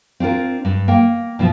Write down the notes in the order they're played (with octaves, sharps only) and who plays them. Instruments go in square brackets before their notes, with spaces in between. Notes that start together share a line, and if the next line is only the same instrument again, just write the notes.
[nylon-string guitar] C4 D4 F4 A#4
G2
A#3 G5
G2 B2 F3 B3